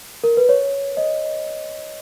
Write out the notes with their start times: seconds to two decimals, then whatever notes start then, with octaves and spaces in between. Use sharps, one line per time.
0.24 A#4
0.37 B4
0.49 C#5
0.97 D#5